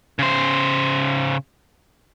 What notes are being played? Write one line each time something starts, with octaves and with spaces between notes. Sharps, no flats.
C#3 C5